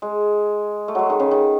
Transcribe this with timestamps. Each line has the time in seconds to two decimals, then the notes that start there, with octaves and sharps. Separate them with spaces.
0.02 G#3
0.88 A3
0.95 F#3 G#3
1.10 D#3
1.20 C#3
1.31 D#3